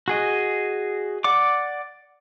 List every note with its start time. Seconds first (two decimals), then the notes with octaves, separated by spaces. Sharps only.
0.08 F#4 G#4 D#5
1.24 D5 F#5 D6